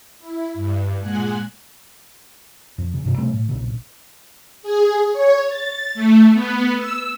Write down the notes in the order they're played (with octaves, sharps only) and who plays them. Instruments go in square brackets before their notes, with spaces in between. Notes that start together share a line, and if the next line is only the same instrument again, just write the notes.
[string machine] E4
G2
A#2 G#3 F#5 G#5 F#6
[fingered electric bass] F2
C#3
G2 C3
C3 G3 A3
A2
B1 A#2 C#3
[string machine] G#4
C#5
A6
A3
B3
E6